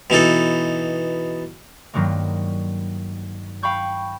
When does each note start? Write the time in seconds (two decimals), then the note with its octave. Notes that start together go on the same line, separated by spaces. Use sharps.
0.10 B2 E3 D#4 A4
1.94 G2 D#3 F#3 G#3 A#3
3.63 F5 G5 B5 C#6 G6